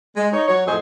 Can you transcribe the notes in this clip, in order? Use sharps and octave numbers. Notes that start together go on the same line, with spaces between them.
G#3
D#4 C#5
F#3 C#5
F2 A2 F#3 G#4 C5 D#5